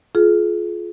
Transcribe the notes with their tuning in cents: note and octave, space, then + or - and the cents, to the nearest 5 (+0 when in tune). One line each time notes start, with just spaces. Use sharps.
F4 +0 G#4 +35